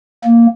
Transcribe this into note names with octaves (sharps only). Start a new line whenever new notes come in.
A#3